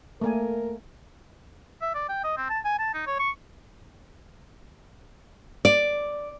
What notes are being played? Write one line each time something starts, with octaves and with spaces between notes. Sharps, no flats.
A3 A#3 A#4 G#5
E5
D5
G5
D#5
C4
A5
G#5
A5
D#4
C#5
C#6
D5